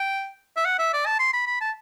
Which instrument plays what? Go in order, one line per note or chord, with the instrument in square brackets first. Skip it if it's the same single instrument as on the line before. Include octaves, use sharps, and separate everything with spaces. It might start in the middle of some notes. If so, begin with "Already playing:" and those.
Already playing: [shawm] G5
E5
F#5
E5
D5
A5
C6
B5
B5
A5